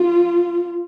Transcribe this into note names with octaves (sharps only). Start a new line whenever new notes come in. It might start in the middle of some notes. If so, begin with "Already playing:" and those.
Already playing: F4